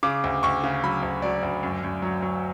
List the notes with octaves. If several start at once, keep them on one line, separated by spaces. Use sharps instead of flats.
C#3 D6
D2
D2 C#6
C#3
F#3 B5
D2
F#3 D5
D2
F#2
F#2
F#3
F#3